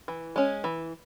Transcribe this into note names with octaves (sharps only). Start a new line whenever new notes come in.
E3
G#3 C#4
E3